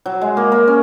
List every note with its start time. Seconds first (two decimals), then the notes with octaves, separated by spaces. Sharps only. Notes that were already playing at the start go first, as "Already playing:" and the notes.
0.06 F#3
0.21 G#3
0.37 A#3
0.52 A#3
0.68 C#4